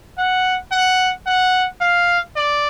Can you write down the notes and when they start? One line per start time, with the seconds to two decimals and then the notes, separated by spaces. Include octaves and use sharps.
0.18 F#5
0.72 F#5
1.27 F#5
1.81 F5
2.36 D5